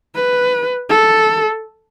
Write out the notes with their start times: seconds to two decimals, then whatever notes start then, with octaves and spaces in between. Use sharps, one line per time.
0.15 B4
0.90 A4